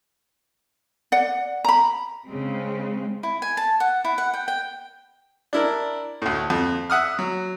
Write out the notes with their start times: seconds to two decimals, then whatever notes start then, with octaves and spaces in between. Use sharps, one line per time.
1.12 D5 F#5
1.64 A#5 B5
2.26 C#3 G#3 C4
3.23 E4
3.42 G#5
3.57 A5
3.80 F#5
4.05 E4
4.18 F#5
4.34 G5
4.48 G5
5.53 D4 E4 A#4
6.22 D2 A2
6.50 F2
6.90 E5 F#5 D#6 F6
7.19 F#3